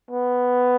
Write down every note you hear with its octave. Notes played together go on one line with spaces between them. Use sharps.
B3